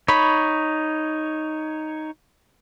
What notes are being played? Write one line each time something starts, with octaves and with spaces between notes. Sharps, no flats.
D#4 C#5 B5